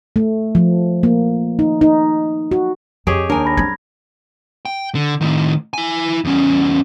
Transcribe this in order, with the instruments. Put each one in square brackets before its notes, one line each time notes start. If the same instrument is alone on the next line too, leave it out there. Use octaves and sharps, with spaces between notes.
[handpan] A3
F3
A#3
D#4
D#4
F#4
[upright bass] F2 [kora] G4 G#4 C#5 [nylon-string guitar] D#5 [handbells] D7
[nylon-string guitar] D#2 G#5 [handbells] D4 [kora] A#4
[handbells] B5 A#6
[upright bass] G3 C4 [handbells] G#6
[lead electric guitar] G5
D3
A2 D#3
E4 G#5
E2 C#4